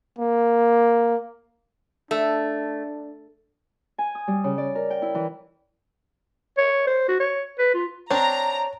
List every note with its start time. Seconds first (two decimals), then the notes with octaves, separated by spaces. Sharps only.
0.19 A#3
2.11 A3 D4
3.98 G#5
4.15 D#6
4.28 G3
4.44 C#3
4.58 D5
4.75 A#4
4.90 G5
5.02 E4
5.15 E3
6.58 C#5
6.87 C5
7.08 F#4
7.20 C#5
7.59 B4
7.74 F4
8.11 C4 D4 C#5 A#5